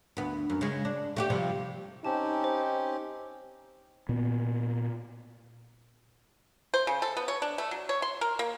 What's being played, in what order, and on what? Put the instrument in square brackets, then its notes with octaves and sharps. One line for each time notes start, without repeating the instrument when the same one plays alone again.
[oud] D2 B3
F#2
C#3 G#3
D4
A3 F#4 G4
C3 F3 G3
[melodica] C4 C#4 G4 [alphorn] D#4 [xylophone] C5 A5
[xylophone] C5
[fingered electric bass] A#2 B3
[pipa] C5
C#3
A4
B3
C#5
D4
A3
F#3
C#5
C6
A#4
A#3